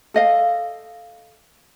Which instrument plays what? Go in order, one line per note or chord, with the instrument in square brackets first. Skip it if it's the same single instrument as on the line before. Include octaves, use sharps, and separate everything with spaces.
[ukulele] A4 D#5 F5